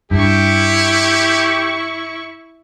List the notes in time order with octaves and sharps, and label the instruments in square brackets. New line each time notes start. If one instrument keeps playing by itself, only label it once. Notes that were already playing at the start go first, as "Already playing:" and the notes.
[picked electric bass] G2 [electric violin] E4 C#6 [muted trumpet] G4